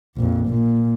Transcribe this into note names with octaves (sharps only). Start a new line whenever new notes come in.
A#1 F2
A#2